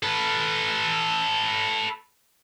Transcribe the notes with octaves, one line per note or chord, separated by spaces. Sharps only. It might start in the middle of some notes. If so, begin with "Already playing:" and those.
A4 B4